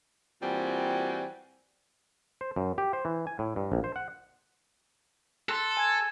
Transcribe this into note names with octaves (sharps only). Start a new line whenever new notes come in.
A#2 E3 G3 C4 F#4 G#5
C5
F#2
G4
C5
E3
G#5
A2
G2
A#1
C5
F#5
A4 C6 F#6
G#5 G#6